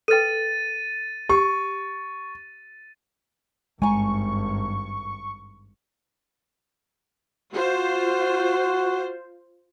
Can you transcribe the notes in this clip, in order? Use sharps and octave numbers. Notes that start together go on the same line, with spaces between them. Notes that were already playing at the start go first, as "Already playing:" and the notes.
A4 B4 G5 A6 D#7
G4 C#6
G#1 G2 G#3 G#5 A#5 C#6
F4 F#4 C5